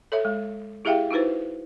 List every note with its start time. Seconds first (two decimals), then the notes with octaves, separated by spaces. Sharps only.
0.12 A4 C#5 E5
0.25 G#3
0.85 E4 G4 G#4 E5 F5 G5
1.11 D#4 E4 F#4 B4 C5